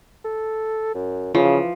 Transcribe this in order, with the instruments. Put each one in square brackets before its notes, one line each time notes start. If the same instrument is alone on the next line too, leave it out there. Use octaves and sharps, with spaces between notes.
[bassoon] A4
F#2
[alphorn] C#3 [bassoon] E3 [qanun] F3